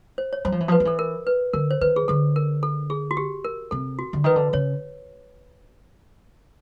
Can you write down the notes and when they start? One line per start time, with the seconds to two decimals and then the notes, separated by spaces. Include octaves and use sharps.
0.18 C5
0.33 C#5
0.45 F#3 C5
0.52 F3
0.60 E3
0.68 F3
0.72 B4
0.80 F3
0.85 E3 A4
0.99 A#4
1.27 B4
1.54 D3 A#4
1.71 C5
1.81 D#3 B4
1.96 G#4
2.08 D3 A4
2.36 A#4
2.63 A4
2.90 G#4
3.11 F#4
3.17 G4
3.45 A#4
3.71 C3 A4
3.99 F#4
4.13 D3
4.24 D#3 B4
4.36 D3
4.53 C#3 C#5